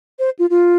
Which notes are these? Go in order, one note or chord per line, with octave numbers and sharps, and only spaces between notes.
C5
F4
F4